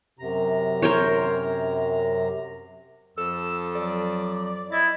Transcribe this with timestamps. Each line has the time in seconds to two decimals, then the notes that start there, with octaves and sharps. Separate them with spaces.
0.19 F#2 C3 A#5
0.82 A#4 C5 C#5
3.18 F2 A4 E6
3.75 F#3 D5
4.72 E4 D#5 A6